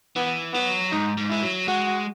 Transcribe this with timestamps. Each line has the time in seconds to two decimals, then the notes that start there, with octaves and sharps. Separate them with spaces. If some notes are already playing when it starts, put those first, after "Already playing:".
0.16 E3 B3
0.53 F#3 B3
0.91 G#2 D#4
1.17 G#2
1.30 G#3 E4
1.42 F#3
1.68 G#3 F#4